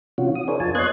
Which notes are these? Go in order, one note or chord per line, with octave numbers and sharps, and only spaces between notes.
C3 E3 C#4 F4 F#4
D#6
D4 G#4 A#4 C5 C#5
F2 F4 G#5 A5
B3 C#5 D#5 C6 F#6 G#6